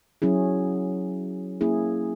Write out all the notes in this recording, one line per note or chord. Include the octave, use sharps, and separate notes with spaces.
F#3 C#4 E4 G#4
A#3 C#4 E4 G#4